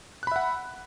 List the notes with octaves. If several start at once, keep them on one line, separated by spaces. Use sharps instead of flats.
E5 F#5 B5 F#6